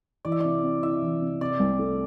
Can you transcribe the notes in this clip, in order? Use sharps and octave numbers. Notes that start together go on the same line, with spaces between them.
E3 D5
E5
C3 D5
C4
E4 E5
E3
C3
C3 D5
C2
A3